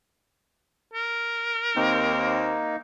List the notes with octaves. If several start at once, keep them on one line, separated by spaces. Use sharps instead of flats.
A#4
D#2 A#3 C4 D#4